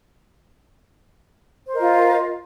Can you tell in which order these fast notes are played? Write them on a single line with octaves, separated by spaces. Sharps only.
C5 A#4 D#5 F4